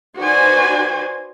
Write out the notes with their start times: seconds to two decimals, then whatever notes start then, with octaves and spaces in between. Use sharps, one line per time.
0.17 D#4 F#4 B4 C5 D5 G#5